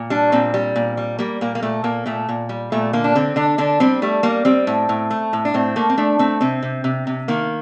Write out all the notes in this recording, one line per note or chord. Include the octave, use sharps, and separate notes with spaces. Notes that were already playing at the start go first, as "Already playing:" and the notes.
Already playing: A#2
G3 D4
A#2 C4
G3
A#2
G3
G3 A#3
A#2 A#3
A#3
A#2 A3
A#2 A#3
A#2 A3
A#2
G3
A#2 A3
D3 A#3
D4
D3 C4
D3 D4
D3 D4
G3 C4
G3 A3
G3 A#3
G3 C4
A2
A2
A3
A2
D4
A2 C4
A3 A#3
C4
A3 D4
A3 C4
C3 C4
C3
C3
C3
D#3 A#3